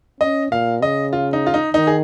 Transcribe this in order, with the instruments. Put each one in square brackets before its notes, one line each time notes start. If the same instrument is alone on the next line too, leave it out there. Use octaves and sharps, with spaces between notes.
[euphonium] C#4 [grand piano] D#5
[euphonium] A#2 [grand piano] F5
[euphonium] C#3 [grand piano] D#5
[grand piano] F4
D#4
F4
D#4
[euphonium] D#3 [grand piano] D#4
[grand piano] G#4